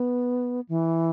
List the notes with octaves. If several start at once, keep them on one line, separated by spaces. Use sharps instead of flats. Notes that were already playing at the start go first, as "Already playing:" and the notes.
Already playing: B3
E3